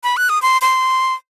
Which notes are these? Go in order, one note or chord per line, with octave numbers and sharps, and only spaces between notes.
B5
F#6
D#6
C6
C6